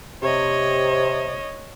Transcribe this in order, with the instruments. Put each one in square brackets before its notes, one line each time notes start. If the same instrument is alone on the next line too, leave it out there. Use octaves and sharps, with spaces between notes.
[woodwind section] C3 [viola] C#5 D#5